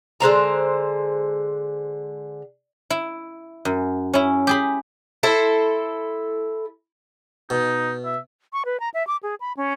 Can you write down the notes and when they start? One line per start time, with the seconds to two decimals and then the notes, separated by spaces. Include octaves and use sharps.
0.20 D3 G#3 C5 A#5
2.90 E4
3.65 F#2
4.14 C#4 E4
4.47 G4 G#4 B5
5.23 E4 A4 C5
7.50 B2 D#4
8.05 E5
8.53 C#6
8.65 B4
8.80 A#5
8.94 E5
9.07 D6
9.23 G#4
9.40 B5
9.57 C#4